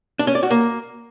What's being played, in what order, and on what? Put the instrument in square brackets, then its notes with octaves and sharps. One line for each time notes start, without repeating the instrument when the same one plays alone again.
[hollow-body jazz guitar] D4
C#4
D5
F#4
A#3